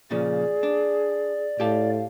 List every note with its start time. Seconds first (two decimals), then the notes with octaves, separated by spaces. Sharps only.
0.11 A#2 C#3 F3 G#4 D5
0.63 D4
1.60 A2 G4 F5 A5